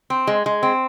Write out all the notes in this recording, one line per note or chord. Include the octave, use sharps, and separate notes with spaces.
C4
G#3
G#3
C4